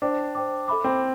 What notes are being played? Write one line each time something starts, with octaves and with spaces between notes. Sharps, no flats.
D4 C5 G5 D6
C5 G5 D6
A4 E5 B5 D6
C4